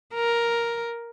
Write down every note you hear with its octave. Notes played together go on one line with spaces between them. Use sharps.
A#4